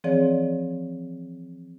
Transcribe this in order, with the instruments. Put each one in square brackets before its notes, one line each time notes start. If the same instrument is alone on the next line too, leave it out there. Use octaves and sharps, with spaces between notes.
[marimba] E3 F3 C4 G#4 C#5 D5